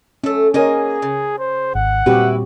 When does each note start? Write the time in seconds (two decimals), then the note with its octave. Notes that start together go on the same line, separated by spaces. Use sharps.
0.24 A3 C#4 A4
0.54 A#3 C#4 G#4 A#4 C#5 D#5 G#5
1.02 C#3
1.39 C5
1.75 G#1 F#5
2.06 A#2 G3 C4 E4 F#4 G4 B4